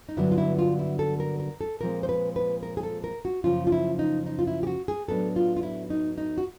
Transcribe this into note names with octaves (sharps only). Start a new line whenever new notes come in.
D#4
G2 D3 F#3 B3 D4 E4
F4
E4
F4
E4
A4
A#4
A#4
A4
A#2 F3 G#3 C4 A#4
C5
B4
B4
A#4
G#4
A4
A#4
F#4
F#2 C#3 F3 A#3 F4
F4
E4
D#4
D#4
F4
E4
G4
F#4
G#4
A2 F#3 B3 D4 A4
F4
F4
E4
D#4
D#4
F#4